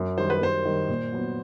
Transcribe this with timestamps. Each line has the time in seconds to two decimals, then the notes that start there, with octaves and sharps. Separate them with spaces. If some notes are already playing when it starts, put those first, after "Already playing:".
Already playing: F#2
0.17 D#3 G3 C5
0.30 B4
0.41 F#2 C5
0.65 D#3 G3
0.89 A#2
1.12 F#3 B3